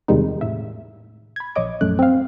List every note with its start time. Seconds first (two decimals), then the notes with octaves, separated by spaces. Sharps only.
0.08 E2 C3 D#3 G3 G#3 D#4
0.41 A2 E5
1.36 B5 G#6
1.56 A#1 C#5 D#5 D6
1.81 A#1 F#2 A3 F#6
1.99 C4 F5